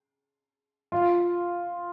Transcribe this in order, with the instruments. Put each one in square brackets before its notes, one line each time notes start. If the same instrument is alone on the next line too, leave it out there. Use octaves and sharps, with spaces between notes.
[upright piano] F4